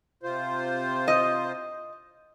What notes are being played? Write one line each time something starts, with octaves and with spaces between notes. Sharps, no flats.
C3 F4 C5
D#5